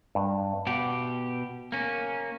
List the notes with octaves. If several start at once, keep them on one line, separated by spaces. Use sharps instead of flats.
G2
B2 G4 F#5
A#3 C#4